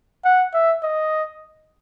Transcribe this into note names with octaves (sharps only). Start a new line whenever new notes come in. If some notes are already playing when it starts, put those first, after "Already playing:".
F#5
E5
D#5